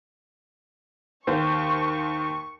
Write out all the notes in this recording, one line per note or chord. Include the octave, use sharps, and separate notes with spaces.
D#2 C5 C#6